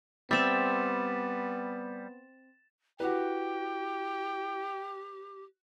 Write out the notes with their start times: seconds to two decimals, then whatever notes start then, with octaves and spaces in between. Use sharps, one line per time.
0.31 G3 B3 C4 E5 A6 E7
3.00 E4 F#4 G4 B4 G5